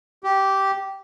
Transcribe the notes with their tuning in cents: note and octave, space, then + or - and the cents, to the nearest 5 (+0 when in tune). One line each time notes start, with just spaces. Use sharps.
G4 -10